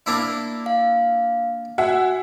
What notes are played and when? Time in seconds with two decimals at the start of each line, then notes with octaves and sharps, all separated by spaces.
0.06 A#3 D4 E4
0.66 F5
1.78 F#4 E5 F#5 G#5